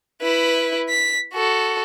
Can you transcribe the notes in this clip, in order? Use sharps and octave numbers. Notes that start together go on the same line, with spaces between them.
E4 B4
B6
F#4 A4